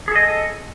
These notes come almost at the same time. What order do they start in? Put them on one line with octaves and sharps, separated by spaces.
G#4 A4 D#5